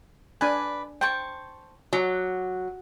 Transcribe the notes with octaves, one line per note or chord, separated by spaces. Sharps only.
D4 B4 D5 G#5
C5 G5 A5 C#6
F#3 D6